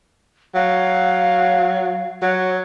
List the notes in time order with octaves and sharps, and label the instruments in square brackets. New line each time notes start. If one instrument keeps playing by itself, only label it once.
[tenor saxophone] F#3 [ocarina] F5
[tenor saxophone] F#3 [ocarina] C#5